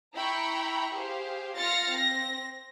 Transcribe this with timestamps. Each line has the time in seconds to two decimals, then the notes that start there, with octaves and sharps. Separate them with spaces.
0.14 E4 G5 A#5 B5 C#6
0.94 G4 G#4 C5 F5
1.57 F4 F5 F6 A6 A#6 C#7
1.89 C4 A#6